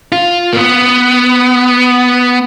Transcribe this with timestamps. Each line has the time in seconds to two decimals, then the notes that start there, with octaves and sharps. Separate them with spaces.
0.12 F4
0.53 A#3
0.56 B3